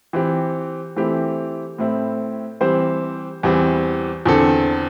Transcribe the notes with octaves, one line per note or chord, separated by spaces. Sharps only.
E3 C4 G4
E3 A3 C4 E4 G4
A2 A3 C4 E4
E3 G3 C4 G4 C5
E2 E3 G3 C4
E2 D3 C4 A4